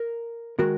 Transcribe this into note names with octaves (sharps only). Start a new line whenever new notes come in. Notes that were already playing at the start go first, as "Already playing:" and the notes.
Already playing: A#4
D#3 G#3 F#4 A#4